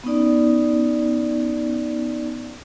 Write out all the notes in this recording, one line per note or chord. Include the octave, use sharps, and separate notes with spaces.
B3 C#4 D#4 D5